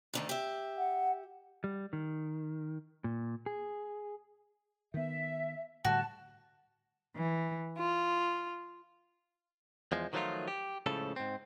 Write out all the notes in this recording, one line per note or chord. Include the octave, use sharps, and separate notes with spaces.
D2 D3 D#3
G4 E5
F#5
G3
D#3
A#2
G#4
D#3 B3 E5
A2 D3 G3 F#4 A5
E3
F4
E2 F3 G#3
D#3 F3 F#3 A3 D#4 F4
G4
C#2 A2 C#3 F3 A4
G#2 C4